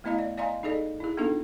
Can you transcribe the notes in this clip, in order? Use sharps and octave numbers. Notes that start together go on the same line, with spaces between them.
A3 B3 E4 D#5 F5 A#5
D5
D5 D#5 F5 G#5 A#5 C6
D#4 G#4 A4 D5 D#5
E4 G#4
A#3 B3 D4 D#4 F4 A4